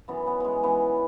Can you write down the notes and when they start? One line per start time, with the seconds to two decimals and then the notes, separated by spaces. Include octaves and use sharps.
0.08 F#2 E3 B3
0.27 B3
0.40 G#3 B3
0.63 F#2 E3 B3